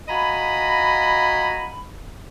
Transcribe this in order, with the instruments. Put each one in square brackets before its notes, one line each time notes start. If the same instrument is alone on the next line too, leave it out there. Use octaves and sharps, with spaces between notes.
[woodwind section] F4 F#4 D#5 G#5 A#5 B5